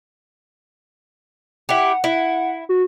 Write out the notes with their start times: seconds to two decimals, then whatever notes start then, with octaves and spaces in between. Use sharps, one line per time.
1.69 E4 G4 F#5
2.04 E4
2.69 F#4